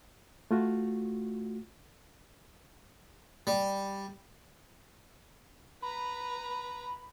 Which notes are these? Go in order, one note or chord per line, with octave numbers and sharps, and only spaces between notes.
A3 F4 F#4
G3
B4 A#5 B5